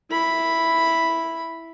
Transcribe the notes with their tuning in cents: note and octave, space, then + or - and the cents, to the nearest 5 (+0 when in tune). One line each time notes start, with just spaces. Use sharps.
E4 +0 B5 +0